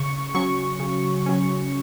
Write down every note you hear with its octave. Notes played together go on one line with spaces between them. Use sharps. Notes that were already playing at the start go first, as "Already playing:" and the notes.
Already playing: C#3 C#6
F#3 C#4 C#6
C#3
F#3 C#4